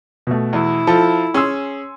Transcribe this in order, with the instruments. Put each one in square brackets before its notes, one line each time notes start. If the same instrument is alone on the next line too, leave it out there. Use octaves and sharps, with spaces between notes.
[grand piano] B2 A3
[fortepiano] E2 [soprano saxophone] E4
[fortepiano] F3 [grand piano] F4 A4
[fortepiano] C#4 G#4 [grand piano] G#5 C6 E6